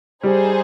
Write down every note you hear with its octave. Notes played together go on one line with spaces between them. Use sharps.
G3 D#4 G#4 C5